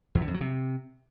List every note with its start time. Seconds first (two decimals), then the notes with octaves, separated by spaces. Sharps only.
0.15 E2
0.21 D3
0.28 F2
0.34 F#3
0.41 C3